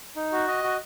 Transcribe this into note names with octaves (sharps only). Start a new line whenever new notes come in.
D#4
F#4
D#5
F#4